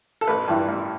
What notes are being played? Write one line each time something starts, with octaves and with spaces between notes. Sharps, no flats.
A4
A1 B4
G2 E3
A1